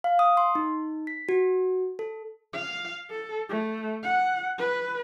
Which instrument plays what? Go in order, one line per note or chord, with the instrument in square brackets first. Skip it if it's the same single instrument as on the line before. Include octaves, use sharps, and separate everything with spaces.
[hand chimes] F5
D#6
C6
D#4
B6
F#4
A4
[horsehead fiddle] F5
A4
A3
F#5
B4